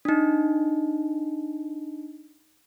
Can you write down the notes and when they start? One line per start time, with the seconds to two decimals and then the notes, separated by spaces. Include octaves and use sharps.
0.05 D4 D#4